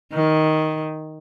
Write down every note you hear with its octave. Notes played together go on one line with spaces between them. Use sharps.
D#3